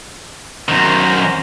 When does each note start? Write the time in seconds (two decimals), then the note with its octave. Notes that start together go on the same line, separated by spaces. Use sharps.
0.69 F#2 D#3 C5 A#5